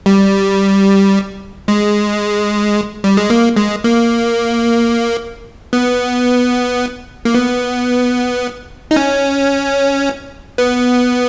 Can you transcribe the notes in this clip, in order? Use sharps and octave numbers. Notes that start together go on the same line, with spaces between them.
G3
G#3
G3
G#3
A#3
G#3
A#3
B3
A#3
B3
D#4
C#4
B3